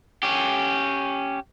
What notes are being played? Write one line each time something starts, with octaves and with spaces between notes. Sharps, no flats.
C#4 G4